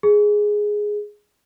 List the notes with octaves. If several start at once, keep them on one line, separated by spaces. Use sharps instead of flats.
G#4